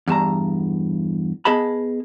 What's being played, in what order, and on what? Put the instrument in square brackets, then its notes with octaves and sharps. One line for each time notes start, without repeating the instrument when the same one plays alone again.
[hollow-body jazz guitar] E2 G2 A5 A#5
B3 G#4 D#5 A5 B5